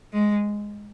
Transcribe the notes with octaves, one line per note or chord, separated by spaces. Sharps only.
G#3